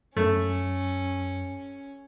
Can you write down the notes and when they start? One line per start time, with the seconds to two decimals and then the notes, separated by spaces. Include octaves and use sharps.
0.17 F#2 A3 C#4